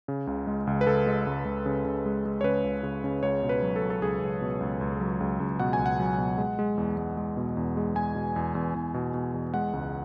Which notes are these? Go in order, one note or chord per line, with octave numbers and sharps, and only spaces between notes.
C#3
C#2
G#3
C#2
B4
C#2 A4
G#3
C#2
C#2
C#3
C#3
G#3
G#3
C#5
C#3 B4
C#2
C#3
C#3
C#2 C#5
B2
B4
F#3
A4
F#3
A4
C#2 G#4
C#2
B2
C#2
C#2
F#3
C#2
C#2
B2 F#5
G#5
C#2
F#5
F#3
B2
G#3
G#3
E2
G#3
G#3
B2
E2
G#3
G#3 G#5
B2
E2
E2
E2
B2
B2
E2
G#3 F#5
C#2